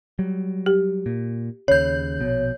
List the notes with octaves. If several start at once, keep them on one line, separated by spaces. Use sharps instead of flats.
F#3 G3
G4
A#2
D#2 C#3 C#5 G6
A#1 B2